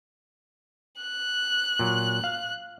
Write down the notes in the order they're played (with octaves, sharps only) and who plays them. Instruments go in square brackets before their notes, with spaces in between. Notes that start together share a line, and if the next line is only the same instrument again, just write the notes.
[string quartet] F#6
[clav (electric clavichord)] A#2 F#3
F5